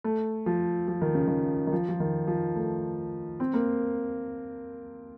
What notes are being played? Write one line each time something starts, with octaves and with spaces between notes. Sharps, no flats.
A3
F3
F3
D#3
C#3
D#3
D#3
F3
F3
D#3
F3
A3
C4
A#3